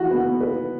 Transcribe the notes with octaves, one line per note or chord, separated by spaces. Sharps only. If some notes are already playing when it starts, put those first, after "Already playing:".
Already playing: E3 F#4
B3
B4